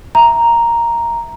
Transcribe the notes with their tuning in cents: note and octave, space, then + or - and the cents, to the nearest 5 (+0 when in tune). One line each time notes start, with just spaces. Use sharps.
E5 +0 A#5 +0